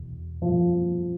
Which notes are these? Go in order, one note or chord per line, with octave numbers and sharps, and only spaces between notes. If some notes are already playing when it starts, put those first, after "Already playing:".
Already playing: E2 B2
F3